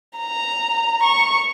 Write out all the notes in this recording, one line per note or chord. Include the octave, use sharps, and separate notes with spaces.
A#5
C#6